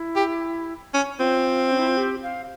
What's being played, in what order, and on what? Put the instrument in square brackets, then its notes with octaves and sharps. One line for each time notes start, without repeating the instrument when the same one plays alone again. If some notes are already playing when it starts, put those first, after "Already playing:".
Already playing: [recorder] E4
[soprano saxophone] G4
C#4
[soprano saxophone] C4 [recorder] F4
[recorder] C#4
E4
F4
G4
F5